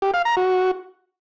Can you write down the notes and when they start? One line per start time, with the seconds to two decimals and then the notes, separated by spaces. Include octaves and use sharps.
0.02 G4
0.14 F5
0.25 A#5
0.37 F#4